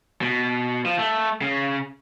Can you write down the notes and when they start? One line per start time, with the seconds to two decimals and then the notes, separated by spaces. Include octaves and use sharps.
0.21 B2
0.86 F3
0.98 A3
1.41 C#3